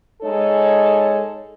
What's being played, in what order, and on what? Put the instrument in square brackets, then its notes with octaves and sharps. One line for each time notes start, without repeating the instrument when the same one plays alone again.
[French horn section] G#3 D#4 A4 C#5